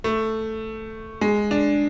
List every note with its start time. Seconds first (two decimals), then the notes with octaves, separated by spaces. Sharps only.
0.04 A3
1.21 G#3
1.51 D4